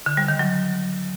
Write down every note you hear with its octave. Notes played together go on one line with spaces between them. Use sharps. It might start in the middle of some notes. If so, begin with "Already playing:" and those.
D3
G3
D#3
F#3